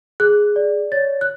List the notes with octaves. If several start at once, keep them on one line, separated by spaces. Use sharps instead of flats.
G#4 F#6
D5
C#5 A6
F#6